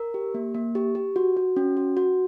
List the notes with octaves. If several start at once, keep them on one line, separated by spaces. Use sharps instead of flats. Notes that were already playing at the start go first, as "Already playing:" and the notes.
Already playing: A#4
G4
A#3
A#3
G4
G4
F#4
F#4
C#4
F#4
F#4